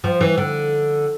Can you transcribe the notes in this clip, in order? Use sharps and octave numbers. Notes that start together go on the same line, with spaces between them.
F3
E3
D3